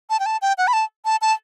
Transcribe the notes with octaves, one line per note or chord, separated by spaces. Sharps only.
A5
G5
A5
G5
F#5
B5
A5
A5
A5